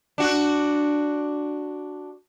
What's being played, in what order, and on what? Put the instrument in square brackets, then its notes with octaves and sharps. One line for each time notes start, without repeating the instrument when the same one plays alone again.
[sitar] D4 F#4